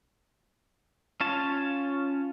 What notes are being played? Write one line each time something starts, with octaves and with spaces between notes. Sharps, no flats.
C#4 F4 C#5 A5